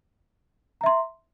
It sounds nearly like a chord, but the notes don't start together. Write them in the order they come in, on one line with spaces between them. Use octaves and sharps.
A#5 E5 C6